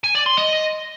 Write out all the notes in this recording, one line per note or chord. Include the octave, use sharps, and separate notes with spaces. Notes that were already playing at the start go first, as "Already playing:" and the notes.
G#5
D5
C6
D#5